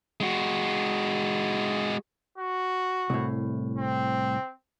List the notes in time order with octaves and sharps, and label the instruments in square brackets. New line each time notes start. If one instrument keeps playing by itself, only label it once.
[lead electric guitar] G#3 F#4
[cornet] F#4
[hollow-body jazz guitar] C2 A2
[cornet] C4